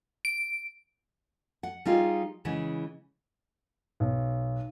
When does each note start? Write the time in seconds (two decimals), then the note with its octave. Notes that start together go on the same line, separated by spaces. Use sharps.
0.25 D7
1.63 F#5
1.85 G3 D#4 F4 G4 G#4
2.45 C#3 E3 G#3 F#5
4.00 B1